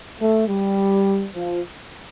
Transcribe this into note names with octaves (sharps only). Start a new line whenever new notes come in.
A3
G3
F3